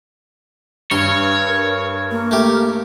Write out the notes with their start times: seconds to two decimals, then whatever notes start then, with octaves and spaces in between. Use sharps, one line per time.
0.91 G2 C#5 C6
1.47 A#4
2.11 A#3
2.31 A3 G4